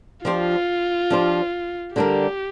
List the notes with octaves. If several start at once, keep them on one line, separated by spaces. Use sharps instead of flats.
F3 D4 F4 G4 C5
F3 D4 G4 C5
D3 G3 D4 G4 A#4